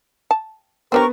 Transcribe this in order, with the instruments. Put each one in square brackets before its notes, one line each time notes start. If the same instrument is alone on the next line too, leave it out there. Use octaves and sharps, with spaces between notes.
[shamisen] A5
[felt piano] B3 B4 [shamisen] C4 D4 G4 [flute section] A#4 C#6